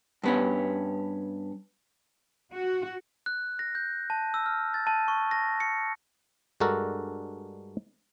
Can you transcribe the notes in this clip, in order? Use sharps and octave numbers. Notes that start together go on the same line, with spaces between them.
G2 B3 C#4
F#4
F#6
A#6
G6
A5
E6
F6
A6
A5
C#6
A#6
C#7
G2 G#3 D4 F#4 A4 A#4